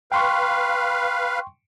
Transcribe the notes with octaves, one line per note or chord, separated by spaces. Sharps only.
B4 F5 G5 C6 C#6